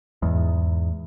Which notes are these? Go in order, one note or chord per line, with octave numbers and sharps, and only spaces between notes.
E2 G#2